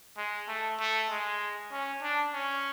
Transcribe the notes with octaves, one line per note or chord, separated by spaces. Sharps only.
G#3
A3
A3
G#3
C#4
D4
C#4